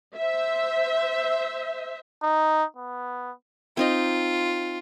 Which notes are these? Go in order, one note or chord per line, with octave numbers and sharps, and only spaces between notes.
C5 E5
D#4
B3
C4 D#4 F4 D#5